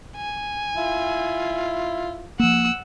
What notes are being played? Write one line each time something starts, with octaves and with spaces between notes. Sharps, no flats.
G#5
E4 F4
F3 A#3 F#5 E6